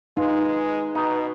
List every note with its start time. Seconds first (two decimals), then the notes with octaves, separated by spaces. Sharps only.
0.17 G#3 D#4 F4 B4
0.95 B2 D#4